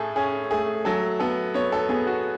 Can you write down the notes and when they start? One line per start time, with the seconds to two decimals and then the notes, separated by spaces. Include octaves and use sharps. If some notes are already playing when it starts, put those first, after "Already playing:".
Already playing: A2 A3 G#4 A4
0.16 C#4 G#4
0.51 A3 G#4
0.85 F#3 A4
1.20 B3 A4
1.54 B3 C#5
1.72 A4
1.89 B3 G#4
2.07 F#4